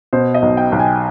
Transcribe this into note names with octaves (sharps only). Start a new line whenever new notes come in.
B2 C5
D#5
B1
G5
B1
G#5